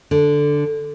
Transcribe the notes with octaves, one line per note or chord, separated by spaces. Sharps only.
D3